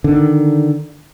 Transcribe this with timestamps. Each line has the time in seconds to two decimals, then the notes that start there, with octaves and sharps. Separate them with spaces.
0.04 D3 D#3